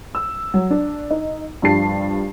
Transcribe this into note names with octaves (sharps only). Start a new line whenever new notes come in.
E6
F#3
D4
D#4
G2 F3 D4 G4 A5 C7